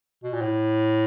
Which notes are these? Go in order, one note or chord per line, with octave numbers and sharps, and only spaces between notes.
B2
A#2
A2